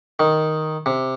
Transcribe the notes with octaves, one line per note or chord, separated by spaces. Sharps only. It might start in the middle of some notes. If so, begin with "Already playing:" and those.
D#3
C3